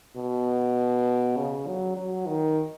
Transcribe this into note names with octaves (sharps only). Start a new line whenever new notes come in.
B2
C#3
F#3
F#3
D#3